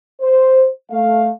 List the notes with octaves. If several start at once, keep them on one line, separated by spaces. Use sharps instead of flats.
C5
A3 F5